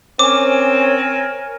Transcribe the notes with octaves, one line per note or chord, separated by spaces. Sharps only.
C4 C#4 A#4 C#5 G#5 D6